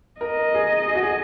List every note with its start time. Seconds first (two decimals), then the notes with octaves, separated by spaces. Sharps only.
0.21 A#4 D#5
0.55 G#4
0.88 G#4
0.95 F#4
1.03 G#4